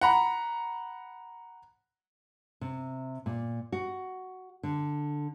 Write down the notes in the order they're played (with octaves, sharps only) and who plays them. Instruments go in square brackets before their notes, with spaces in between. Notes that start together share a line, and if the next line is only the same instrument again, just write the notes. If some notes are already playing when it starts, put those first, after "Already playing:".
[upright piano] F#5 A#5 B5
[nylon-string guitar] C3
A#2
F#4
D3